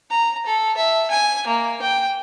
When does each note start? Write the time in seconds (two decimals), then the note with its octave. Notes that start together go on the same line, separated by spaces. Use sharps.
0.10 A#5
0.46 A4
0.77 E5
1.11 G#5
1.47 A#3
1.82 G5